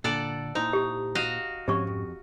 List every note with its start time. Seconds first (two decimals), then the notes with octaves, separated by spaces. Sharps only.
0.04 A#2 D3 A4 D5 F#5
0.55 A#2 D#4 E4 C5
0.73 G4
1.15 F#4 D#5 F5
1.68 G#2 F3 C4 C#4 G4 C#5 C#6
1.87 F2